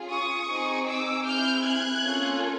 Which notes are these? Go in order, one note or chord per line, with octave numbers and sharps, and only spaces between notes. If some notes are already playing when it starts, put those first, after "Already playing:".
Already playing: C#4 F4 G#4
C#6 D#6
C4 D#4 G#4
D6 E6
C4 E4 G#4 F6 G6
F#6 G#6
A#3 C#4 F4 A4